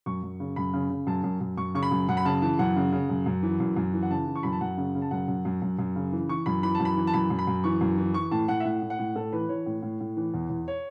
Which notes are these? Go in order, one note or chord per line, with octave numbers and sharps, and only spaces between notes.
F#2 C#6
F#2
C#3
F#2 B5
C#3
C#3
F#2 A5
F#2
F#2
F#2 C#6
C#3 C#6
B5
F#2
F#2 F#5
B5
C#3 A5
E3 A5
F#2 F#5
C#3
C#3
F#2
F#2
E3
F#2
F#2
E3
F#5
C#3 A5
E3
C#6
F#2 B5
A5
F#2 F#5
C#3
C#3
A5
F#2 F#5
F#2
F#2
F#2
F#2
C#3
E3
E3 C#6
F#2 B5
E3 B5
A5
F#2
B5
E3
A5
F#2 B5
F#2
B5
F#2
E3 C#6
F#2
E3
E3 C#6
A2 A5
A2 F#5
E5
A2 F#5
A2
F#5
A2
A2 A4
E3 B4
E3 C#5
A2
A2
A2
E3
E2
E2
C#5